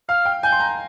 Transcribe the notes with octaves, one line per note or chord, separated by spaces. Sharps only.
F5 F6
G5
G#5 G6
C6
A#5